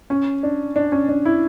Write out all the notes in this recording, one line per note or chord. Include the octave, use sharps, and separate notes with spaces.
C#4
D4
D4
C#4
D4
E4